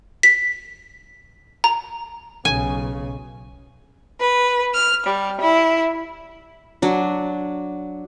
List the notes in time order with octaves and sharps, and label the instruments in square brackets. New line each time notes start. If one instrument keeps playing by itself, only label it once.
[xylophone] B6
A#5
[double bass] B1 C#3 [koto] G#5
[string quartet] B4
F6
G3
E4
[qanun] F#3 D4